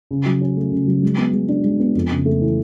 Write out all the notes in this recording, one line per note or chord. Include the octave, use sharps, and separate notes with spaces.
C#3
F#3
C#4
A3
C#3
F#3
G#3
B3
G#3
D4
G#3
B3
F2
C#3
A3
E3